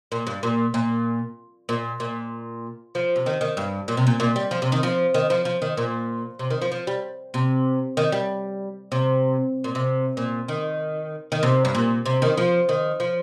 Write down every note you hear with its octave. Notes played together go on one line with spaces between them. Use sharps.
A#2
G2
A#2
A#2
A#2
A#2
F3
C3
D#3
D#3
G2
A#2
C3
A#2
A#2
G3
F3
C3
D#3
F3
D#3
F3
F3
D#3
A#2
C3
D#3
F3
F3
G3
C3
D#3
G3
C3
A#2
C3
A#2
D#3
D#3
C3
G2
A#2
C3
D#3
F3
D#3
F3